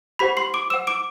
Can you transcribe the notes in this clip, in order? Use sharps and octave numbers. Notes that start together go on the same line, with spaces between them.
G4 C5 F#5 B5 B6
C6 C7
D6 D7
C5 F#5 E6 E7
D6 D7